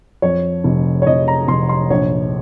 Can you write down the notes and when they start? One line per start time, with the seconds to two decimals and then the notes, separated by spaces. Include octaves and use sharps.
0.22 F2 C#5
0.64 F1
1.02 C#5
1.07 F1 D#5
1.28 A#5
1.48 F1 C6
1.69 C6
1.90 A#1 C#5